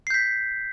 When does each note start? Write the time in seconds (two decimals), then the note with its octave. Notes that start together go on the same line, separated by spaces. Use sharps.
0.07 C7
0.10 G6
0.14 B6